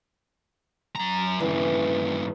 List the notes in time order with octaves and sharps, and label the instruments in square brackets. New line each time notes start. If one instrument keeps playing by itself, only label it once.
[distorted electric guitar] F#2 A#5
[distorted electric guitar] G2 C#3 [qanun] E3